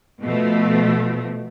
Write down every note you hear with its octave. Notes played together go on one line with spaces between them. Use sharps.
B2 F3 A3